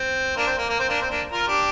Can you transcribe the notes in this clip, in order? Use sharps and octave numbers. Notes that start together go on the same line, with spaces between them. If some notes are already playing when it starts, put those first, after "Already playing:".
Already playing: C4
A#3 D4
C4
A#3
A#3
C4
A#3 D4
C4
A#3 D4
F4 A#4
D4 G4